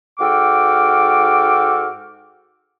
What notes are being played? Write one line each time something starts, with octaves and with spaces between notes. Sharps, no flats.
G#2 F#4 A4 G5 D6 F6